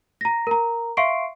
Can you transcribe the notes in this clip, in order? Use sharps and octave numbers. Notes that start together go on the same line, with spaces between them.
A#5 A#6
A#4 A#5
E5 F5 C6 C#6 C7 D7